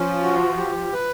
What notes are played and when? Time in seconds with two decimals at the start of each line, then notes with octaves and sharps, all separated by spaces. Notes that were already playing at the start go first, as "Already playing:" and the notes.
Already playing: F3 C#4
0.23 F#4
0.57 G4
0.93 B4